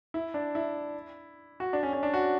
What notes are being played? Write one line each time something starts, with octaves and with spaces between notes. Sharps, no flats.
E4
D4
E4
F#4
D4
C#4
C#4
D4
F#4